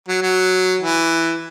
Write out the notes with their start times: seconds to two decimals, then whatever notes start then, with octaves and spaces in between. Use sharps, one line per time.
0.08 F#3
0.22 F#3
0.80 E3